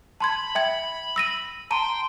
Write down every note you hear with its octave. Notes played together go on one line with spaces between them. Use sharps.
A5 B5 C6 G#6
E5 G5 G#6
E6 A#6 D#7
G5 A5 A#5 C6 D#7